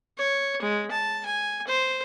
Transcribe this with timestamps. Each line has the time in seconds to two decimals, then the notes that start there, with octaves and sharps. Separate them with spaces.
0.18 C#5
0.62 G#3
0.91 A5
1.25 G#5
1.67 C5